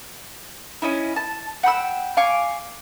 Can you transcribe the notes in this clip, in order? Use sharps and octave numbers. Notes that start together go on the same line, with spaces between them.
C#4 D#4 E4
A5
F#5 G5 B5 E6
F5 G#5 C#6 D6